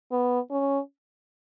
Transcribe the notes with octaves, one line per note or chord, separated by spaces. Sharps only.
B3
C#4